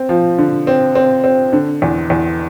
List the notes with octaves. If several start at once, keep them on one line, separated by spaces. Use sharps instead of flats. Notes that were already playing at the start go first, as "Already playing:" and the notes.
Already playing: C4
F3
D3
C4
C4
C4
D3
E2
E2